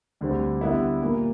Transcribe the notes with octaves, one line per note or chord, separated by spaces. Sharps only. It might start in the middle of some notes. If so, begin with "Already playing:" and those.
D2 D3 G3 C4
D3 G3 B3 E4
A#2 G3 A#3